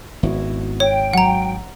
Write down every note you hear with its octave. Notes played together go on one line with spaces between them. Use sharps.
G#1 B3 E4 F#4
C#5 G5
F#3 F#5 A#5